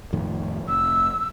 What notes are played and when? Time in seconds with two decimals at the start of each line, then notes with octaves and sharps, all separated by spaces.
0.13 F2 A2 D#3
0.68 F1 E6